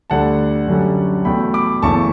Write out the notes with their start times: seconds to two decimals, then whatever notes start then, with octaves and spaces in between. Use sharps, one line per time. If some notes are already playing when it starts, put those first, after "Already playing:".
0.10 D2 D3 G3 D4 F#5 A5
0.67 F#2 D3 G3 C#4
1.25 E2 B2 A3 G5 B5
1.54 B5 D6
1.82 F#1 E2 C#3 E3 A3 A5 C#6